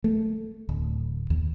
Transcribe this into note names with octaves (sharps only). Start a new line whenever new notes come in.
A3
D1
D#2